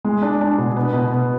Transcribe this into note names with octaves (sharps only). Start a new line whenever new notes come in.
G#3
D4
D4
B2
B3
B2
B3